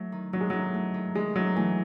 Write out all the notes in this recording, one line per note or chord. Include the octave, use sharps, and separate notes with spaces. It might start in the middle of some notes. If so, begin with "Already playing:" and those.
Already playing: F#3 A3 E4
D#3
D#3 F#3
G#3
F#3 E4
A3
D#3
D#3 G#3
F#3 E4
E3 A3